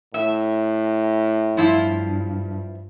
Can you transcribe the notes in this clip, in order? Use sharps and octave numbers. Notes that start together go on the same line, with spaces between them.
A2 E5
G2 F3 E4 F4